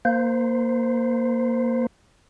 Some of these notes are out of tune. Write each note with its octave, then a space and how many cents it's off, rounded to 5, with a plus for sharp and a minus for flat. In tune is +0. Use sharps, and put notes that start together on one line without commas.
A#3 +0 C5 -15